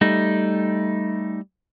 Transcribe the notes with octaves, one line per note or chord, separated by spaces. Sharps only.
G3 A3 D#4